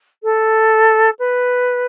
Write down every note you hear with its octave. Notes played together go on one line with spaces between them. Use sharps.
A4
B4